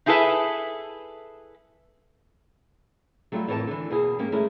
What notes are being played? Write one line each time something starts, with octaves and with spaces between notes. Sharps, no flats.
D#4 E4 G#4 A4 B4 E5
F#3 G3 A3 F4
F2 A2 E3 F4 A#4 A5
D3 E3
E2 B2 A#3 G#4 G#5
G#2 A#3 C#4 G4
D#3 G#3 A3 C#4 E4 A#4